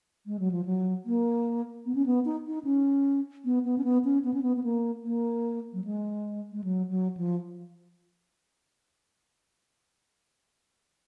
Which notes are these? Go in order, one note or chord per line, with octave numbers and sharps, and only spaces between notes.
G#3
F#3
F3
F#3
A#3
B3
C#4
B3
D#4
D#4
C#4
B3
B3
C#4
B3
C#4
B3
C#4
B3
B3
A#3
A#3
F#3
G#3
G#3
F#3
F#3
F3